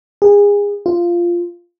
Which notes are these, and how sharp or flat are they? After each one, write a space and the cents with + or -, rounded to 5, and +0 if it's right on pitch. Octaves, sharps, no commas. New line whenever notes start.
G#4 -30
F4 -10